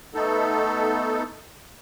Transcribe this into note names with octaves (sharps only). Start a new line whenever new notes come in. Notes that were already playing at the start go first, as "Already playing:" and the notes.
A3 B3 D#4 A4